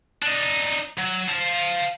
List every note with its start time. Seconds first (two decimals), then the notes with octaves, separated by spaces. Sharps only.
0.22 D4 D#4
0.98 F#3
1.28 F5 A5